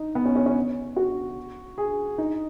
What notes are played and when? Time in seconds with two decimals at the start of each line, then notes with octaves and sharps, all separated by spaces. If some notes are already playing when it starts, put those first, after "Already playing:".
Already playing: D#4
0.15 B3
0.26 C#4
0.36 C#4
0.46 C#4
0.96 F#4
1.78 G#4
2.18 D#4